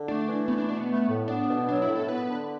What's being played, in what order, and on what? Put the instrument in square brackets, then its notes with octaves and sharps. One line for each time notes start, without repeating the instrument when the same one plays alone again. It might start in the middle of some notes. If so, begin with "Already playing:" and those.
Already playing: [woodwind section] D3
[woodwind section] A3 [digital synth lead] D4
[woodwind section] E3
[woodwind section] A3 [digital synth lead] B3
[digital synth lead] D4
[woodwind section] B2 [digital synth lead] D4
[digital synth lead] B3
[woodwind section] A3
A2
[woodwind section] B3 [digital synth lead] D4
[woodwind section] B2
[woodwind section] F#3 [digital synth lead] D4
[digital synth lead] E4
[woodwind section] A2
[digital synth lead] A4
[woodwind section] B3 [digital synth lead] B4
[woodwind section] D3